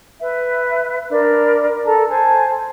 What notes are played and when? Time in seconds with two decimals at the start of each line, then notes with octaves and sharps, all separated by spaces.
0.19 B4 E5
1.09 D4 A#4 B5
1.85 A4 A5 A#5
2.08 C5 G#5 A5